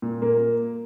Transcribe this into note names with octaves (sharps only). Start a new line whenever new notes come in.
A#2
A#3